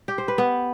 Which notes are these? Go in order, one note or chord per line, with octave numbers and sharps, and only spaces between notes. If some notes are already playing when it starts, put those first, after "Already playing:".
G4
C5
B4
B3